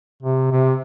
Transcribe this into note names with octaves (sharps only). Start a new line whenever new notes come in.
C3
C3